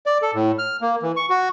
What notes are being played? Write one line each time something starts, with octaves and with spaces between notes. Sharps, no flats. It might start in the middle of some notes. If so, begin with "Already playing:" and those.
D5
A4
A2
F6
A#3
E3
C#6
F#4